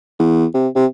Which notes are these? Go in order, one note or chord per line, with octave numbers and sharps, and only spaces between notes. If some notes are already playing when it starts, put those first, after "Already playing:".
E2
C3
C3